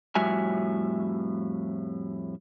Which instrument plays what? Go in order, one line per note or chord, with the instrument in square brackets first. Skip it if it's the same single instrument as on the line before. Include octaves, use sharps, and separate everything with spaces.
[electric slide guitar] F2 A2 G3 F#4 E5 G#5